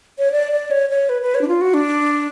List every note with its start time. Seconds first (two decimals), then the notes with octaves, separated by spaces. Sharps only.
0.19 C#5
0.32 D5
0.52 D5
0.71 C#5
0.90 C#5
1.09 B4
1.22 B4
1.35 C#5
1.41 D4
1.48 F4
1.61 F#4
1.74 D4